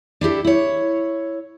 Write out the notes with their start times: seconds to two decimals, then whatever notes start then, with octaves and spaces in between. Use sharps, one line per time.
0.21 D4 E4 G4 A4
0.45 E4 C#5